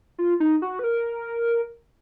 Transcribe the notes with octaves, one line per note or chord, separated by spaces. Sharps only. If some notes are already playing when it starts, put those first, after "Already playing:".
F4
D#4
F#4
B4
A#4